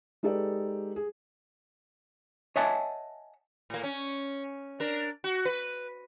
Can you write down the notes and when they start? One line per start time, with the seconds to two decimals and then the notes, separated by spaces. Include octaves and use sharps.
0.23 G#3 D#4 G4 A4 B4 D5
0.96 G#4
2.56 C#5 D#5 E5 F#5 G#5 A5
3.70 A2 A#3
3.84 C#4
4.80 D4 A#4
5.24 F#4
5.45 B4